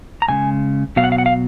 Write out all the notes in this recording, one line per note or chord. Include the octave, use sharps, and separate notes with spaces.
A#5
F#2 C#3 G#3 G#5
B2 F#3 B3 F5
F#5
F5
F#5
F5